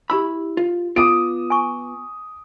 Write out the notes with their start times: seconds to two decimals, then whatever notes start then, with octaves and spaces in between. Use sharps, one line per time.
0.10 E4 G4 B5 E6
0.57 F4
0.96 B3 F4 D6 D#6 D7
1.50 G#5 C#6